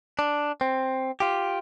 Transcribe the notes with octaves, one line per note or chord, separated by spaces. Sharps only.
D4
C4
F4 G4